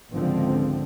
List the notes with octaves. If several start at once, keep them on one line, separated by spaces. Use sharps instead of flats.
G#1 C#2 D3 F3 C4